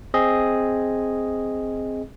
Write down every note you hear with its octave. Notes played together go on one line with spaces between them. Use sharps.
C4 G#4 D#5